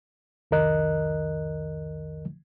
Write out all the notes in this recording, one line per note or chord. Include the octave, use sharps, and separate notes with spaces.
C2 F2 D#3 A#4 D#5 F#6